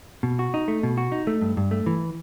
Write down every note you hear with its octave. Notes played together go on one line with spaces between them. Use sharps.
B2
F#4
D#4
A3
B2
F#4
D#4
A3
G2
G2
A3
E3